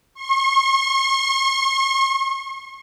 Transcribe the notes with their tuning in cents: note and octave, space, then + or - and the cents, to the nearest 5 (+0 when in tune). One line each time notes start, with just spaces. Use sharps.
C#6 -45